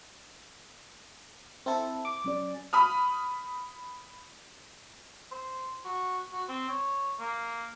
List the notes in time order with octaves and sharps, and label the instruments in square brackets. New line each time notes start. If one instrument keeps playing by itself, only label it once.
[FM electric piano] C4 E4 A4
D6
[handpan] F#3 C#4 D5
[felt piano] B5 D#6 F6
[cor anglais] C5
F#4
F#4
C4
C#5
A#3